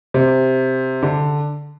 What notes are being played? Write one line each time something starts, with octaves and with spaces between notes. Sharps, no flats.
C3
D3